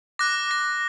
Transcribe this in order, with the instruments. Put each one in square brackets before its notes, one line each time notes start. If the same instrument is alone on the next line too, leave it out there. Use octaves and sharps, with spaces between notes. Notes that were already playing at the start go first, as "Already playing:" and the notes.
[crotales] D6 F#6 A#6
A#6